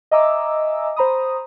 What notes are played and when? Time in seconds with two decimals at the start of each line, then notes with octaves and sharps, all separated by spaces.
0.11 D#5 E5 G#5 A#5 D6 E6
0.96 C5 A#5 B5 D#6